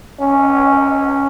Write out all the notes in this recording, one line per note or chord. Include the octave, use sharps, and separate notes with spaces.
C#4